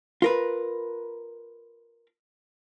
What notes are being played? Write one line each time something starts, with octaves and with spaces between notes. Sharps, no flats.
F4 A#4 B4